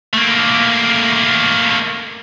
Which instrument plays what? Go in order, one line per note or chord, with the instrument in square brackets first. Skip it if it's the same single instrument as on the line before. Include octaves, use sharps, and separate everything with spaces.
[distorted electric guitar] A3 A#3